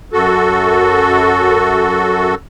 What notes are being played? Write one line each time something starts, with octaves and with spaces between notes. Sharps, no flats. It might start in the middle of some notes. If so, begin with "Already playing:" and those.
F#2 F#4 A4